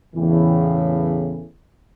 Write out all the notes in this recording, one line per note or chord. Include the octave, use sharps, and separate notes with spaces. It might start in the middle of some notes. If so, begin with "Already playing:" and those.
E2 A2 C#3 E3